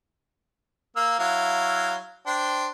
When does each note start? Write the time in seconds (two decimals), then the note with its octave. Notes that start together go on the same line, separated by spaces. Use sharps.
0.96 A#3 F5 E6
1.19 F#3 E4 F5
2.27 D4 C5 G5